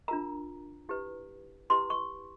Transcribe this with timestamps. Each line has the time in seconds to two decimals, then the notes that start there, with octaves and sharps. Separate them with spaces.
0.08 D4 F4 A#4 A#5
0.89 E4 G4 B4
1.70 E4 G4 B4 C6
1.90 C#6